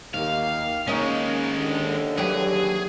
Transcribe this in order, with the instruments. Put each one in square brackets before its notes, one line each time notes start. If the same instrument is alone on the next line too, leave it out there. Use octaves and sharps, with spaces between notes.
[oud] D#2 [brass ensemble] A#3 D#4 G4 [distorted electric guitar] F5
[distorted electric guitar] D#3 G#3 [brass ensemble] A#3 [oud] C#4 D#4
[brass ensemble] D#2 D3
[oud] E3 F#3 G4 [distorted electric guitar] G#4